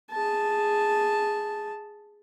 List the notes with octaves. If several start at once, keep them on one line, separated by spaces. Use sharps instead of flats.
G#4 A5